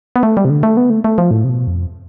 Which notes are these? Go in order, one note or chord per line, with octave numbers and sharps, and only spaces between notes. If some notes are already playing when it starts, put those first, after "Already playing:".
B3
A3
G3
C3
D3
A3
B3
A3
A3
F3
A2
C3
B2
F2